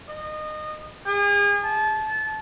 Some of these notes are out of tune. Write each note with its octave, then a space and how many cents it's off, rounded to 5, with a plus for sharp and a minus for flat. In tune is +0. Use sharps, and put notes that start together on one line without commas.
D#5 -25
G#4 -40
A5 -25